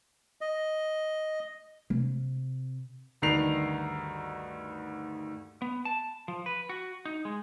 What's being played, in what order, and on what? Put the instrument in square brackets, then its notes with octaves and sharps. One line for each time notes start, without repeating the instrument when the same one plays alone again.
[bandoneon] D#5
[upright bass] C3
[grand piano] D2 G2 D#3 D#4 C7 F7
[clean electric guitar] B3
A5
F3
B4
F#4
D#4
G#3